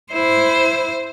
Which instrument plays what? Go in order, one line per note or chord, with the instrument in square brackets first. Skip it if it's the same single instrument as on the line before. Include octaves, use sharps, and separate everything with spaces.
[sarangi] E4 [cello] C5